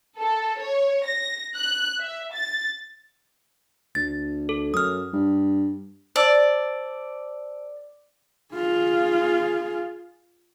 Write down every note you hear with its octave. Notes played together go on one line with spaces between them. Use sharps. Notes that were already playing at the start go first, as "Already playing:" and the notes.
A4
C#5
A#6
F#6
E5
A6
D2 A6
A4
F#2 D#6 F6
G2
C5 D5 A5 E6
F4 G#4